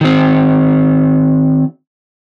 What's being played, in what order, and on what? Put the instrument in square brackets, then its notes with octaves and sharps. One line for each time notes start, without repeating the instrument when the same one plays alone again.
[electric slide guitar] D#3 C4